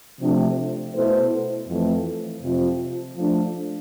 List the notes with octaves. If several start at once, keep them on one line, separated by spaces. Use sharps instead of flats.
C3 F3 A3 D4
B2 A3 E4 A4 C5
F2 E3 A3
F2 C3 F3
F3 A3 D4